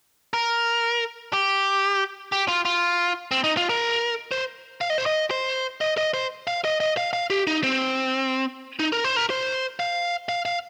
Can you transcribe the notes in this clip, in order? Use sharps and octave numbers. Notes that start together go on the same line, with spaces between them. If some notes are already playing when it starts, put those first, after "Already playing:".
A#4
G4
G4
F4
F4
C4
D#4
F4
A#4
C5
F5
D#5
C5
D#5
C5
D#5
D#5
C5
F5
D#5
D#5
F5
F5
G4
D#4
C4
D#4
A#4
C5
A#4
C5
F5
F5
F5